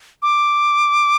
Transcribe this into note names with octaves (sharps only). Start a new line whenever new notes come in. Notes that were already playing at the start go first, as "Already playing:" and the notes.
D6